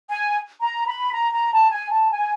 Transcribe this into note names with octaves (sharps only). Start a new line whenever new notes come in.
G#5
A#5
B5
A#5
A#5
A5
G#5
A5
G#5